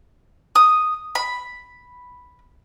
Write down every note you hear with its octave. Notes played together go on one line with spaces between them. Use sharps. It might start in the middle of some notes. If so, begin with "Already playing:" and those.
D#6
B5